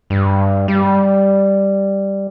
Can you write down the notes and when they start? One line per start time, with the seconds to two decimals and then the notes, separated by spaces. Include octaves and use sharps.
0.10 G2
0.68 G3